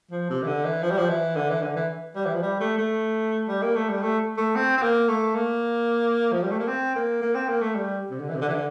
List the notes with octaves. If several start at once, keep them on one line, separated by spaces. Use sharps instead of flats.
F3
C3
E3
D3
E3
F3
G3
F3
E3
D3
E3
D3
E3
G3
E3
F3
G3
A3
A3
G3
A#3
A3
G3
A3
A3
C4
C4
A#3
A3
A#3
F3
G3
A3
A#3
C4
A#3
A#3
C4
A#3
A3
G3
C3
D3
E3
C3
D3
E3
D3